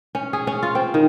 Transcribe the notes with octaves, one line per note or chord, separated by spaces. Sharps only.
C#4
G#4
C#4
F4
C4
D#3